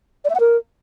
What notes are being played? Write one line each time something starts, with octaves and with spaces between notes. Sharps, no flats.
D5
E5
F#5
A#4